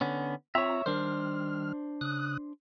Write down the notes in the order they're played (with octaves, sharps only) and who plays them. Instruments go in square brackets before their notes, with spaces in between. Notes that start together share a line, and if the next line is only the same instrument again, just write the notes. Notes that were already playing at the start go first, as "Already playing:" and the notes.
[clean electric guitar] D3 B3 C#4
[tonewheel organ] C4 F4 A#5 [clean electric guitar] C#5 E5
[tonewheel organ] D#3 G3 F6 [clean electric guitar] D4 C5
[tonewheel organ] C#3 D#6 F#6